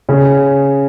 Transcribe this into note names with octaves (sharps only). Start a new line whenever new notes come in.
C#3 C#4